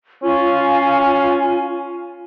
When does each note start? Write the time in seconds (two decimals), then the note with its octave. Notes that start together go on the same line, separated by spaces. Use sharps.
0.23 C#4 F4 G#5